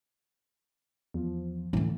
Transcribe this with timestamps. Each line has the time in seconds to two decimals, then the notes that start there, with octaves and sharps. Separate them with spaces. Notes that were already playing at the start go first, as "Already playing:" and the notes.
1.14 E2 F3
1.73 A2 D3 E3 A3